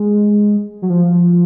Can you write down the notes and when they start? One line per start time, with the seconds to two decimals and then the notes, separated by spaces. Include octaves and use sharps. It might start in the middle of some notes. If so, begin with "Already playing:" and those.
Already playing: G#3
0.82 F#3
0.90 F3